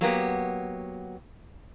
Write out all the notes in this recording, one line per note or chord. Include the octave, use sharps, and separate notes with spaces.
F#3 A#3 B3 G4